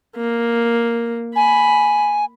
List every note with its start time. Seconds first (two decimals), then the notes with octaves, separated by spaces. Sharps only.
0.17 A#3
1.36 G#5 B5